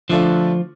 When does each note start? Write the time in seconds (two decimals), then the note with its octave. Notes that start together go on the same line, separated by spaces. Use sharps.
0.10 D3 F3 A3 D4 F4 A4